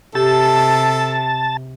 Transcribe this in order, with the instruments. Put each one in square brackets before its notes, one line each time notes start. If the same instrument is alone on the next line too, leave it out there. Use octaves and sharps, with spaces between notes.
[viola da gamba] C3 [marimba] G4 [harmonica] A4 [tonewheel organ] A5